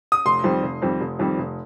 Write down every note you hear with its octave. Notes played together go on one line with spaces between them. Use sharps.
D#6
F1 C6
F2 D#3 G3 C4
F1
F2 D#3 G3 C4
F1
F2 D#3 G3 C4
F1